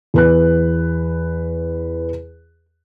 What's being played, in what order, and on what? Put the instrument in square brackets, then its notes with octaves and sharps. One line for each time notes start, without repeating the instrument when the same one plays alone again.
[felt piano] E2 B4 F#6